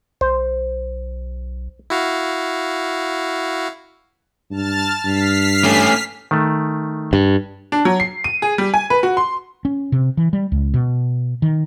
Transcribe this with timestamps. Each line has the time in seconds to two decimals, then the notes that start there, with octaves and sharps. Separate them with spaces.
0.21 B1 C5
1.90 E4 F#4 F5
4.51 G2 A5 F6 A6
5.05 G2 F6 B6 C7
5.64 A3 C#4
6.31 D#3 A3
7.13 G2
7.72 D4
7.85 F#3
8.00 C7
8.24 D#7
8.42 G#4
8.58 G3
8.74 G#5
8.90 B4
9.03 F#4
9.17 C6
9.65 C#4
9.92 C3
10.17 E3
10.33 G3
10.52 C#2
10.74 B2
11.42 D#3